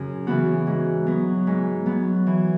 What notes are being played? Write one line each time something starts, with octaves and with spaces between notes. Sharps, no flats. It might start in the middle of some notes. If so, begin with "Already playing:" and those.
Already playing: F#2 C#3 F#4
C#3 E3 B3 F#4
G#2
F#3 B3
G#2
F#3 B3
E3